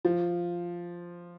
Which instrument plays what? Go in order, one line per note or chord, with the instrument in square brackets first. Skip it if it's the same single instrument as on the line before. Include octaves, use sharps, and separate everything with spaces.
[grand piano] F3